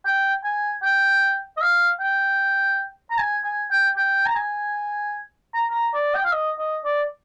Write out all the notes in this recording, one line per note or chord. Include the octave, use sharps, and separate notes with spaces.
G5
G#5
G5
D#5
F5
G5
A#5
G#5
G#5
G5
G5
A#5
G#5
A#5
A#5
D5
G5
F5
D#5
D#5
D5